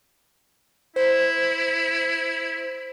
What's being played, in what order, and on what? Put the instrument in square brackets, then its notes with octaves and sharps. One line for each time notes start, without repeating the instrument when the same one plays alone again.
[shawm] E4 [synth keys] C5